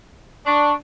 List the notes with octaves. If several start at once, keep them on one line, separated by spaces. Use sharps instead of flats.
D4 C#6